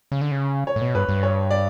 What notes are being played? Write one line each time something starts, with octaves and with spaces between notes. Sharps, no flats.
C#3
D3
C#3
C#5
A2
B2
G2 B4
G2
C#5
D5